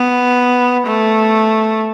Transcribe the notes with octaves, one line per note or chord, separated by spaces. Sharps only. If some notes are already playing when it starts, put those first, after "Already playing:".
Already playing: B3
A3